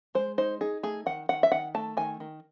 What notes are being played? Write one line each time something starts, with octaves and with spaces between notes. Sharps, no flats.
G#3 C5
D#4 C5
D#4 G#4
A3 G#4
D#3 F#5
D#3 F#5
E5
D#3 F#5
A3 A5
D#3 G#5
D#3